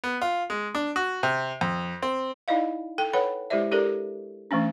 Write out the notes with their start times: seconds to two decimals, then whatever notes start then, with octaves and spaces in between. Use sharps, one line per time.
0.04 B3
0.21 F4
0.50 G#3
0.75 D4
0.96 F#4
1.23 C3
1.61 F2
2.03 C4
2.48 D#4 E4 D5 D#5 F5
2.98 A4 G5
3.13 A4 B4 C#5 F#5 B5
3.50 G#3 E4 G4 C5 D5 E5
3.71 D4 G4 A4 A#4 D5
4.51 E3 A3 C#4 D4